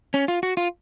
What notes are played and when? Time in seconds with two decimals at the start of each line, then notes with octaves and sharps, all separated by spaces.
0.14 C#4
0.28 F4
0.43 F#4
0.57 F4